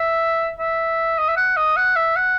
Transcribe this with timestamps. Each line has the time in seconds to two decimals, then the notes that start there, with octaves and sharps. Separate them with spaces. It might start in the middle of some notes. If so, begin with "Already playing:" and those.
Already playing: E5
0.59 E5
1.18 D#5
1.28 E5
1.37 F#5
1.57 D#5
1.77 F#5
1.96 E5
2.16 F#5